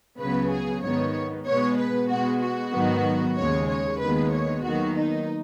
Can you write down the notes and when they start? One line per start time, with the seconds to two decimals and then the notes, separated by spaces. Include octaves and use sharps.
0.19 C#2 C#3 F#3 B3 B4
0.51 G#4
0.83 G#2 D#3 B3 C#5
1.47 B2 G#3 B3 C#5
1.78 B4
2.09 B2 G#3 B3 F#4
2.42 F#4
2.73 G#2 D#3 F#3 B3
3.36 D#2 C#3 G#3 C#5
3.68 C#5
4.00 D#2 D#3 G#3 B3 B4
4.32 C#5
4.63 D#2 D#3 F#3 B3 F#4
4.95 D#4